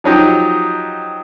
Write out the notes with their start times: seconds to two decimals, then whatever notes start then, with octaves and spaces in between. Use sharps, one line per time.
0.04 F3 F#3 D#4 G4